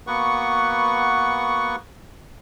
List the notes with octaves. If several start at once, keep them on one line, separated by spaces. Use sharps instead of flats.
A#3 B3 F#4 B4 F#5 C#6